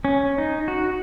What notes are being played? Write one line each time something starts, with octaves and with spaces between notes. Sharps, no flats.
C#4
D#4
F#4